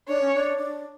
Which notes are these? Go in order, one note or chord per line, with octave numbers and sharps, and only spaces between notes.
D4 C#5
C#4
D4
D4